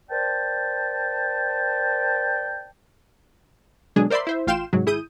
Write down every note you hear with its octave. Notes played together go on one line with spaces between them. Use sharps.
A#4 C5 D5 G5 A5
B2 D3 F#3 G#3 D4 G#4
A#4 C5 D5 E5 B5 C6
E4 C5 E5
A1 F4 F5 G5 C6 E7
G#2 C3 F#3
G#1 E4 G#4 D#6 G6 D#7